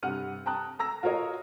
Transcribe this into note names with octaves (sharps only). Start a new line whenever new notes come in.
G2 C3 F#5 F6 D#7
G5 A5 A#5 D#6 F#6
A#5 E6 A#6
F4 F#4 A#4 C#5 D#5